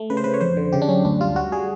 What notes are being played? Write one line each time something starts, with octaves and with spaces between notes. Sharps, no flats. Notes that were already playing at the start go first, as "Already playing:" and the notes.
Already playing: A3
C#3 B4
C5
C#3 B4
C#5
F2 C5
D3
C#3 G4
D4
F#2 C#4
D2 D4
G3 F4
G3 F#4
G3 G#4